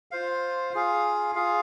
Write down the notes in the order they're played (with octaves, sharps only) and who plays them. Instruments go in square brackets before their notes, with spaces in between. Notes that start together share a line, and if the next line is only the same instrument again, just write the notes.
[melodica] F4 C5 F5
F4 G#4 F5
F4 G#4 F5